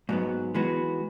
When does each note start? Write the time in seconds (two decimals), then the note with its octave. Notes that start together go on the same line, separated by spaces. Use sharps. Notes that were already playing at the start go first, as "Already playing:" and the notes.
0.09 G#2 F#3 B3
0.54 E3 G#3 B3 F#4